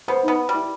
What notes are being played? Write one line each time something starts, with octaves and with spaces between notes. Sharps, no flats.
B3 C5
B3 D#4
G3
E4